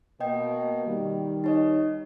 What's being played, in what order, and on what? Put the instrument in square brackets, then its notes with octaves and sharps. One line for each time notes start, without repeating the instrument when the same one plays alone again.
[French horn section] B2 A#3 B3 [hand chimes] D#5 G5
[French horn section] D#3 G3
[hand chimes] D#4 C#5 D#5